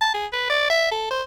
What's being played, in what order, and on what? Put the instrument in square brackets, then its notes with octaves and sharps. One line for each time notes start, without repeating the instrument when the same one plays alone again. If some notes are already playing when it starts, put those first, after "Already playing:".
[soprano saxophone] A5
G#4
B4
D5
E5
A4
C5